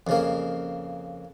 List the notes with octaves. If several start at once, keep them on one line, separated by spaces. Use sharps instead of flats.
F2 C#3 A#3